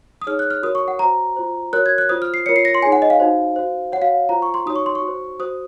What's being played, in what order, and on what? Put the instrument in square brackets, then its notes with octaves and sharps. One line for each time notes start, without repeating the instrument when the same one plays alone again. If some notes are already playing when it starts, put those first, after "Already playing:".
[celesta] D#6
D#4 G#4 C#5 F6
F#6
F6
F#4 A#4 C#5 D#6
C#6
F#5
F#4 C5 A#5
F4 C5
F#4 A#4 C#5 F#6
G#6
F#6
F4 C5 D#6
F6
C7
F4 A#4 C#5 C#7
C7
A#6
C6
D#4 G#4 C#5 G#5
F#5
D#5
F5
D#4 F#4 C5
F#4 C5
C#5 F#5
F#4 F5
F4 C5 A#5
C#6
C6
D#4 F#4 C#5 D#6
C#6
C6
C#6
F#4
C5
F#4 C5 D#6